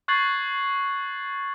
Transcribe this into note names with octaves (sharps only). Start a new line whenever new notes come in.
C#6 F#6 G#6 A6 C7 F#7